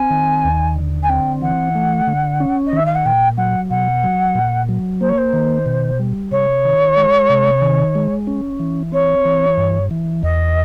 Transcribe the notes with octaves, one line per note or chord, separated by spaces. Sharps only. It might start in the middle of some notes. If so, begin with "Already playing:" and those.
Already playing: C4 G#5
D#3
D#2
D3
G#5
C4 G5
E3 F#5
A3
D3
C#4
D#5
D#3 E5
F5
F#5
A#2 G5
F#3 F#5
B2 F#5
F#3
A#2
F#3
A#3 C5
C#5
C5
D#3
B2
G3
C3 C#5
D#3
G#3
C3
D#3
G#3
C#4
E3
C4 C#5
E3
G2
E3
E2 D#5